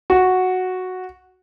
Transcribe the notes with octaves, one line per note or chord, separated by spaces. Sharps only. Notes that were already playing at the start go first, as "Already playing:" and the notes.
F#4